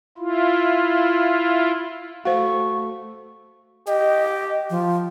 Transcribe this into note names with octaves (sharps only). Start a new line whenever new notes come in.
E4 F4
A3 F#4 C5 F5 C#6
G4 D#5
F3